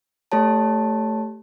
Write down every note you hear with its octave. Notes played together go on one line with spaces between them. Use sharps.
A3 G4 C#5 A5